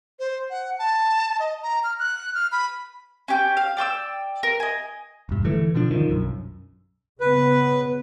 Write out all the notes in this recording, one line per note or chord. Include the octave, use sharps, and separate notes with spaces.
C5
F#5
A5
D#5
A#5
F6
F#6
F6
B5
C#4 G4 G5 G6
F5
D5 G5 D6 E6
A#4
D#5 G#5
E1 G2
D3 E3 A3
B2 D3 F3 D4
F#2 D3 D#3 F3
B1 F#2
C#3 B3 B4